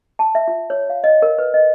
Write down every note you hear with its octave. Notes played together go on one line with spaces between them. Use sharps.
A5
E5
F4
C#5
F5
D#5
A#4
B4
D#5